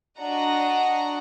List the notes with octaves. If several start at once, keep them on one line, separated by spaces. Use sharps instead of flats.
D4 F#4 D#5 F#5 A#5